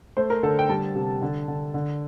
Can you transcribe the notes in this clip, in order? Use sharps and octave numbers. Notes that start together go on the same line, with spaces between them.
A3 C5
A#4
D3 A4
G5
G3 A5
C3
D3
D3
D3